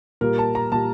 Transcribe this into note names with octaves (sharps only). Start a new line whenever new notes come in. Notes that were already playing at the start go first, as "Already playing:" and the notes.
A#2 G3 A#4
A5
A#5
A#2 G3 A5